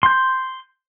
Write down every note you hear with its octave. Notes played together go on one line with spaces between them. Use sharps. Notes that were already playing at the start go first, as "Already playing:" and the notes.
C6 G6